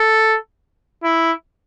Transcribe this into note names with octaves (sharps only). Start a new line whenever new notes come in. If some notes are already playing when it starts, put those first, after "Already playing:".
Already playing: A4
E4